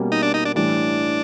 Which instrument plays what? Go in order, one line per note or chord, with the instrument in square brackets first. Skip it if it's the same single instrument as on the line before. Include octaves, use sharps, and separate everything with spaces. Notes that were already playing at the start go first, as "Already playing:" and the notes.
Already playing: [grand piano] B2 G3 A#3 C#4
[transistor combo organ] D#4
D4
D#4
D4
[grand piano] A2 E3 G3 [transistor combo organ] D4